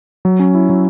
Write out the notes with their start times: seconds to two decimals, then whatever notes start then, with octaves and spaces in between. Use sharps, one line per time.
0.25 F#3
0.40 C#4
0.55 E4
0.70 F#3